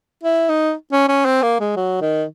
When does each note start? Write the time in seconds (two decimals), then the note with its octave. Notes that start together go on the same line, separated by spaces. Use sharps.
0.23 E4
0.49 D#4
0.92 C#4
1.08 C#4
1.25 C4
1.42 A#3
1.60 G#3
1.76 F#3
2.01 D#3